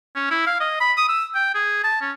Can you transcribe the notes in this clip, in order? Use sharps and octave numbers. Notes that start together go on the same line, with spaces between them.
C#4
E4
F5
D#5
B5
D#6
E6
G5
G#4
A5
C#4